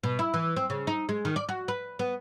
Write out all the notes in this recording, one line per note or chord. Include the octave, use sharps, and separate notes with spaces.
B2
E4
E3
C4
C#3
D#4
G#3
D#3
D5
F#4
B4
B3